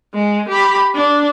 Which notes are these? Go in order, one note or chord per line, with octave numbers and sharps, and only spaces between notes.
G#3
G4 B5
D4